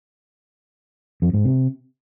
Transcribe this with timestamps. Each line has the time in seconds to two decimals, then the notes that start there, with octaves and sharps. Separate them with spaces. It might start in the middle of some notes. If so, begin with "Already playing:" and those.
1.22 F2
1.33 G#2
1.45 C3